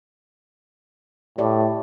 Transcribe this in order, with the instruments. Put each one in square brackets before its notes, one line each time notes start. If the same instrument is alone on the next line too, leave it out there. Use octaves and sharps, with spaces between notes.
[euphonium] A2 [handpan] G4 D5